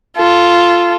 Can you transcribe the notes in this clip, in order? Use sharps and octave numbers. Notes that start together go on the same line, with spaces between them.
F4 A4